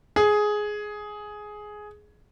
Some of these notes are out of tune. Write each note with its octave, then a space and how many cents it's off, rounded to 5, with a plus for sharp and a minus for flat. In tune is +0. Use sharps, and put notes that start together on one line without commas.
G#4 +10